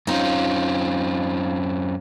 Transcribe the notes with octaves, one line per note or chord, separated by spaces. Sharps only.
F#2 C4 C#4 D#4 F4